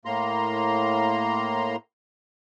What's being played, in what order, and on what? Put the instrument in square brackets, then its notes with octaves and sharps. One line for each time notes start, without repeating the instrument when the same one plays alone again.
[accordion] A2 A#3 A#5 C6